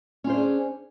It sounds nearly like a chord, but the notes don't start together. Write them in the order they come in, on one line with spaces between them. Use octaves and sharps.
C#4 F4 C5 D4 G#4